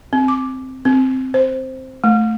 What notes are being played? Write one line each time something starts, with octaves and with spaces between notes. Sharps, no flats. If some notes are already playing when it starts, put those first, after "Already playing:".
C4
D6
C4
C5
A3